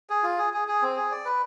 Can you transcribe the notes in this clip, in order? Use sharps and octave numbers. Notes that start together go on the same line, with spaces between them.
G#4
F4
G#4
G#4
G#4
C4
G#4
D5
B4